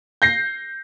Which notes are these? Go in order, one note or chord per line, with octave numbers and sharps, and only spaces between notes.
G6 A#6 C7